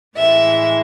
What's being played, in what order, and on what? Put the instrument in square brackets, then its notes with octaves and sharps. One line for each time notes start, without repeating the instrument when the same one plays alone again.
[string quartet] A2 E3 G#3 E5